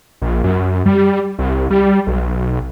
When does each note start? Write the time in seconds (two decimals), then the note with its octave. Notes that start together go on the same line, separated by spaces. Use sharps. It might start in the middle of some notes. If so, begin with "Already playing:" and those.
0.22 A#1
0.44 F#2
0.86 G3
1.39 C2
1.71 G3
2.07 B1